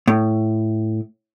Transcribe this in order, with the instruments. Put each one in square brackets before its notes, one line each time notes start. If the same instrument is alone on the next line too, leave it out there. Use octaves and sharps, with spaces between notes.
[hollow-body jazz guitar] A2